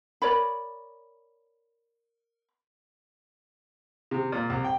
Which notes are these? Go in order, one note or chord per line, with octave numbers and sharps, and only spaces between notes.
A#4 C#5 D5 B5
C3
A#2
C2
G5